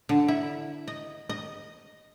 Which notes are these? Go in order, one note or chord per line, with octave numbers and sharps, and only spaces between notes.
D3
E4
D#5
D#5